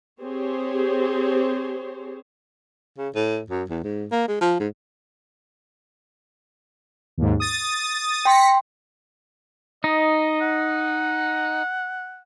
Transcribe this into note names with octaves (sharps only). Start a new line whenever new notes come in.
C4 G4 G#4 C5 C#5
C#3
A2
F#2
E2
G#2
A#3
G#3
F3
G#2
D#2 G#2
D#6 A6
G5 C6 A#6 B6 C#7
D#4 D#5
F#5